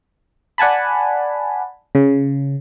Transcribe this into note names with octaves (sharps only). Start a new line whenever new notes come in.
D5 F#5 G#5 A5 B5
C#3